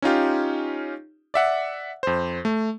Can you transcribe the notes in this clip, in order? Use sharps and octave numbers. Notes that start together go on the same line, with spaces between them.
C#4 D#4 F4 G4
D5 E5 F#5
F2 C5
A3